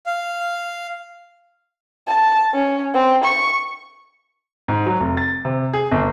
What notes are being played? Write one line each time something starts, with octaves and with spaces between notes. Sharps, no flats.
F5
A5
C#4
C4
C#6
G#2
F#3
F1
A6
C3
G#4
G1